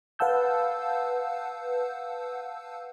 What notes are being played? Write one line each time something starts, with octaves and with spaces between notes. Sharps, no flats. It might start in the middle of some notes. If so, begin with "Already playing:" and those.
B4 F5 F#5 A5 E6 G6